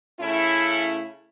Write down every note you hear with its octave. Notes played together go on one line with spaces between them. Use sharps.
C#3 A3 C#4 E4